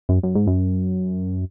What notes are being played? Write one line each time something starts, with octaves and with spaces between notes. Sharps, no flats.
F#2
F#2
G#2
F#2